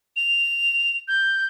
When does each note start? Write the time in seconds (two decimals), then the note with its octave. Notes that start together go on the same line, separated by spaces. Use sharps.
0.16 F7
1.08 G6